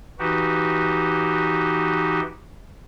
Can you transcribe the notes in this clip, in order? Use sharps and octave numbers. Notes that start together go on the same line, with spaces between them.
E3 D#4 F#4 G4